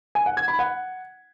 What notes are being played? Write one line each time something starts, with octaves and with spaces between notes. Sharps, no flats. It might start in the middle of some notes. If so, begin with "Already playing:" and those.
G#5
F#5
G#6
B5
F#5